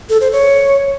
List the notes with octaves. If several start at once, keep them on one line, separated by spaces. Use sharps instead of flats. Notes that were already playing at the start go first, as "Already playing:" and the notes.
A4
C5
C#5